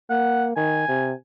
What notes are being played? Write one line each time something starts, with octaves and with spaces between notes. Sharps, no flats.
A#3 F#5
D#3 G#5
C3